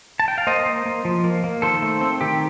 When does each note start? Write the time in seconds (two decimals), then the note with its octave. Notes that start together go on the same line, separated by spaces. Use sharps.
0.20 A5
0.28 G5
0.38 F5
0.47 A#3 C5 D#5
0.66 A#3
0.85 A#3
1.05 F3
1.24 A#3
1.44 A#3
1.62 D#3 A4 C5
1.82 A3
2.01 C4
2.21 D#3 G4